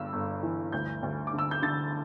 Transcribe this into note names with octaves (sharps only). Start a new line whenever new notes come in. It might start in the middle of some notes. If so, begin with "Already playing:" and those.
Already playing: G1 G2 E6
G1
E3
D2 G6
D2
D6
D3
E6
G6
D3 A6